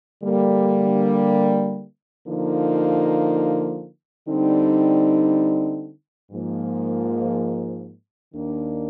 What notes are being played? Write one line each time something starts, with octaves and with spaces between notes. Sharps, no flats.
D3 G3 A#3
D3 F3 A#3 D#4
D3 G3 C4 D#4
G#2 F3 A#3
D#2 D#3 A#3 D4